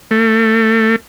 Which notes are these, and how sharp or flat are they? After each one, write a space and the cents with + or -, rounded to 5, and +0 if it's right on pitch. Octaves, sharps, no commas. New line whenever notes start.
A3 +25